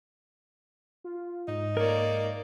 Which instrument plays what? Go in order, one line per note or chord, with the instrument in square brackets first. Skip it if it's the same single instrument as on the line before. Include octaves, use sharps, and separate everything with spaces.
[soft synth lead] F4
[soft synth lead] G#2 [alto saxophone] D#4
[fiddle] A#3 D5 [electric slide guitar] A#4 C#5